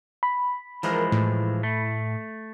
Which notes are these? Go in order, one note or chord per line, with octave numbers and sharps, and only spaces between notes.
B5
E3 F3 G#3 A#4
A2
A3